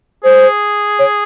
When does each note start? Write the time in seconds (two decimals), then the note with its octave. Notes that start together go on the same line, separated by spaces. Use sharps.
0.24 G#4 C5
0.99 C#5